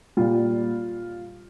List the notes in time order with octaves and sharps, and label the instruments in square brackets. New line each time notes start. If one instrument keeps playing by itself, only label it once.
[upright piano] A#2 G3 F4